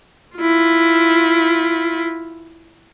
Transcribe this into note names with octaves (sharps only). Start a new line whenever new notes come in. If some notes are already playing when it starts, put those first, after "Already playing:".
E4 F4